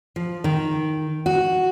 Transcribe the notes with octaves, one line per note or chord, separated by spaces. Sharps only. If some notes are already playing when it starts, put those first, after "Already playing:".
F3
D#3
F#4